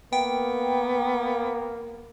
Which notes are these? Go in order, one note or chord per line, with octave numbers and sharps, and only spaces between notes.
A#3 B3 G5